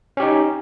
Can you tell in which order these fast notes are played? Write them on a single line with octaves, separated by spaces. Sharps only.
C#4 G4 D#4